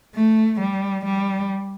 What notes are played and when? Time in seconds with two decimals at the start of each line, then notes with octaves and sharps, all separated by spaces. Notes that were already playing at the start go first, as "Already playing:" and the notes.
0.14 A3
0.59 G3
1.04 G3